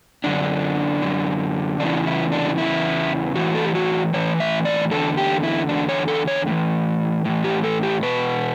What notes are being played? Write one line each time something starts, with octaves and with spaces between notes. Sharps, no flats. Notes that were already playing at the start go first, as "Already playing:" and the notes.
F#2 D3 D4
F#2 D3
E2 C#3 E3 D4
E4
D4
E2 C#3 E3 E4
A2 E3 F#4
A4
G4
F#4
A2 E3 C#5
E5
D5
E2 D3 A4
G4
E4
E2 D3 D4
C#5
A4
C#5
A2 E3
A2 E3
G4
A4
G4
E2 B2 B4